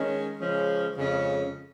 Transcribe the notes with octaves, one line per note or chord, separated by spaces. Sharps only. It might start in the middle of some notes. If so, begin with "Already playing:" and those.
Already playing: D#3 G#3 C#4
C#3 F3 G#3 C#4
F2 C#3 G#3 C#4